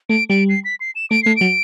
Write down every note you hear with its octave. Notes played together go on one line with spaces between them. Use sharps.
A3 D7
G3 D7
C7
B6
C7
E7
A3 D7
A3 C7
F#3 D7